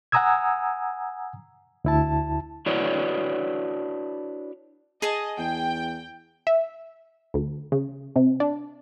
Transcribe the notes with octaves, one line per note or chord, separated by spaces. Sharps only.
F#5 G#5 A#5 D#6 E6 G#6
D2 E4 A5
D4 E4 F#4 B4 C#5 D5
G#4 D#5 G#5 A5
E2 G5
E5
D2
C#3
C3
D4